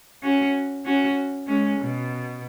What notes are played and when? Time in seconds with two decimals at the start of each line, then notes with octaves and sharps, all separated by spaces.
0.23 C#4 F#4
0.86 C#4 F#4
1.47 G#3 C#4
1.79 B2